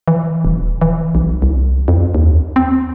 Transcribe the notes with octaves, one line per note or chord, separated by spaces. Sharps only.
E3
D#1
E3
B1
C2
F2
D#2
C4